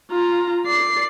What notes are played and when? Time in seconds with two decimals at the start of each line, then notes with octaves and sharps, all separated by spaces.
0.11 F4 A#5
0.66 D5 C7